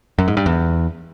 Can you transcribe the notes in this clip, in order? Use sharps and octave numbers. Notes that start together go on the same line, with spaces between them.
F#2
G#2
G2
E2